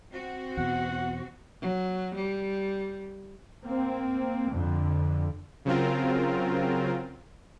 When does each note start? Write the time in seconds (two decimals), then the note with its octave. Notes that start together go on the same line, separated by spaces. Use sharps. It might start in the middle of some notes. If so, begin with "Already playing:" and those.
0.13 C4 F#4
0.57 E2 B2 F#5
1.62 F#3
2.15 G3
3.64 A#3 C4
4.50 F2 D3
5.65 C#3 F#3 C4 F4 A#4